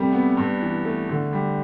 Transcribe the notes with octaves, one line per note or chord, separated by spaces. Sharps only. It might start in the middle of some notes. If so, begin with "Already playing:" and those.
Already playing: C3 G3 A3
B3
G2
E3
A3
D3
G3